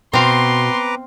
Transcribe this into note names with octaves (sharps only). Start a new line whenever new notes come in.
B2 C4 B4 F5 A#5 C6 D6